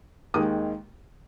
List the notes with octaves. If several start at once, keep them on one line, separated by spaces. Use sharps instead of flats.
D#2 D#3 G#3 D#6